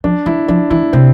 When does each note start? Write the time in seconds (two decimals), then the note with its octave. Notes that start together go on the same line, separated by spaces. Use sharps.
0.04 F3 D4
0.26 E3 E4
0.48 F3 D4
0.70 E3 E4
0.93 C3 C4